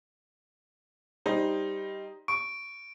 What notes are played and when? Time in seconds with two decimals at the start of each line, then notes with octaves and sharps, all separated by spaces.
1.26 G3 D#4 C5
2.28 C#6 D7